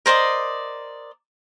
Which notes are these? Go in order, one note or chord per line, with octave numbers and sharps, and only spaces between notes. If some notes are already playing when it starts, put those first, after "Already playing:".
A#4 C5 D5 D#5